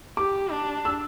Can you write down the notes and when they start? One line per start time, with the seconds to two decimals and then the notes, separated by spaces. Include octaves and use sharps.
0.17 G4 D6
0.52 D4
0.85 E6